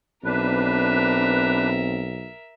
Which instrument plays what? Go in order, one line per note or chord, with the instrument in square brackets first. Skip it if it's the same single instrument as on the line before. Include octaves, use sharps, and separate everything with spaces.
[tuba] B1 [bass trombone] C4 [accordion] D4 B4 [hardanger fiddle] A#4 E5